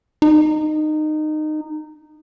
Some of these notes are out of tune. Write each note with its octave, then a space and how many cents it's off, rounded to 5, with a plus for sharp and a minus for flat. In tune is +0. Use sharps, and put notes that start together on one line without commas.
D#4 -20